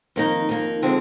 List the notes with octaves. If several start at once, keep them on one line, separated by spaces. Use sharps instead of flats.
F2 D#3 A#3 D#4
F2 D#3 A#3 D#4
D3 F3 G#3 C4